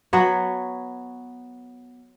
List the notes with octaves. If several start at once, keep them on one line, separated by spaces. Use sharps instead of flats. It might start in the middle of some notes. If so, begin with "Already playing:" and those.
F#3 B3 B4 C#5